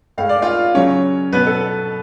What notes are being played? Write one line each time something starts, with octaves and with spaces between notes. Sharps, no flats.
A2 G#3 F5
D5
F4 F5
C#3 F#3 C#4 C#5
B2 F#3 B3 B4
A4
A4